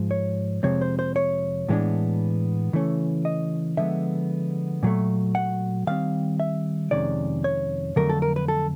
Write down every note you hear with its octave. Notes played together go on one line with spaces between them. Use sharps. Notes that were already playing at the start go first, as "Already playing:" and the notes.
Already playing: G#2 F3 G#3
C#5
F2 C3 F3 G#3 C4 C#5
C5
C5
C#5
A2 E3 G#3 B3 D4
C#3 E3 A3 C#4
D#5
D3 F3 G#3 B3 E5
A#2 F#3 A3
F#5
D#3 G3 C4 F5
E5
F2 C3 D#3 G#3 C#4 D5
C#5
F2 D3 F#3 A3 A#4
A4
A#4
B4
A4